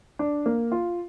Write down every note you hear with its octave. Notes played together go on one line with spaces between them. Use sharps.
D4
A#3
F4